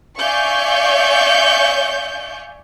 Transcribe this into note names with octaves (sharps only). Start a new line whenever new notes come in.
D5 E5 F5 G#5 C#6 G6